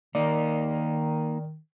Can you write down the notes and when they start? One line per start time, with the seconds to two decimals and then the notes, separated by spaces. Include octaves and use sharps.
0.15 D#3 A#3 D#4 D5